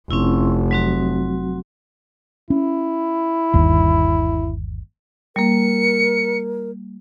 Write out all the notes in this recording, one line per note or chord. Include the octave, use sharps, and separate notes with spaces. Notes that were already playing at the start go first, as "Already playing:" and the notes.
F1 C4 C#4 E4
F#3 C4 F#4
C#4 E4
G1 D#2
G3 A#3 A#4 C#7